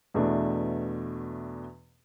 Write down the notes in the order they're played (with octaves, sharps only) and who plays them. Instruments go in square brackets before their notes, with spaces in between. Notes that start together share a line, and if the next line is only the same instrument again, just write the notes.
[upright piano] E2 B2 A3 D4